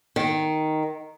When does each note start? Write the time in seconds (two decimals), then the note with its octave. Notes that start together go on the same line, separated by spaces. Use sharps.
0.16 D#3